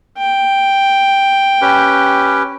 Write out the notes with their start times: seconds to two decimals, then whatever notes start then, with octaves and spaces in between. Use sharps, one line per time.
0.18 G5
1.61 C#4 G4 B4